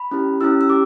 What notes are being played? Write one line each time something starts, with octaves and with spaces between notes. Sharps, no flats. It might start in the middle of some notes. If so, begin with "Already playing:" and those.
Already playing: B5
C#4 E4 G4
C#4 E4 G4 E6
E6
G4 D6